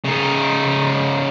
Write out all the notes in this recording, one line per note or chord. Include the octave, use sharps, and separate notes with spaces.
C#3 D#4